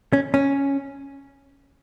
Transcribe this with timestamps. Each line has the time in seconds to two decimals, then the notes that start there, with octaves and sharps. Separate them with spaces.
0.13 C#4
0.34 C#4